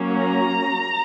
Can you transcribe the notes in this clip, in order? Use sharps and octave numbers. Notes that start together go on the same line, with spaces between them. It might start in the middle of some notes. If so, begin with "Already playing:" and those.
Already playing: F#3 A#3 C#4
A#5